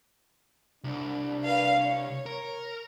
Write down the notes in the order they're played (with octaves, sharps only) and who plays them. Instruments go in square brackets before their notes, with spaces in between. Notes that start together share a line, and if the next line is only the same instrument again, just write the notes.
[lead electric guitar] C2 [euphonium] D4
[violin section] B4 F5
C#5
[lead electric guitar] A#4